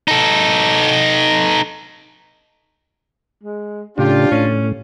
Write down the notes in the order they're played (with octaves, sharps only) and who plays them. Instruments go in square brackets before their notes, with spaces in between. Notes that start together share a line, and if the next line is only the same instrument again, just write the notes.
[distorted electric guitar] D#4 A4
[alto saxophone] G#3
[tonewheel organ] A2 C#3 [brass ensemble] D4 F4 [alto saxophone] G4
[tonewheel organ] A2 [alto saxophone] C#4